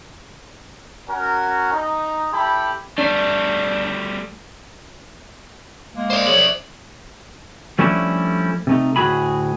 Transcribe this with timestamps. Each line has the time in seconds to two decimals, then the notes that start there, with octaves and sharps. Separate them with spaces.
1.10 C#4 F#4 A#4
1.73 D#4
2.33 E4 G4 A4 B5
2.98 G3 A3 D4
5.95 G#3 A#3
6.10 C5 D5
6.27 F3 G#4 C#5 F#7
7.79 F3 G3 A3 C#4 D4 E4
8.67 C3 A3 D#4
8.96 D2 A2 F#4 G#4 G#5 B5